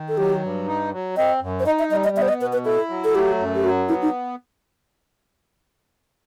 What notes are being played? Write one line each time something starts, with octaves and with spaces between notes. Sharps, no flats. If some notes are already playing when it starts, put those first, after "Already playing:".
Already playing: D#3
A4
F#3 G4
G2
D#4
F#3
C4 D#5
F#2
C5
D#4 D#5
E5
G3 D#5
D#5
B3 E5
C5
D#5
B2 B4
B4
E4 A4
F#3
A4
A3 G4
F#2
G4
F#3 F#4
B3 E4
D#4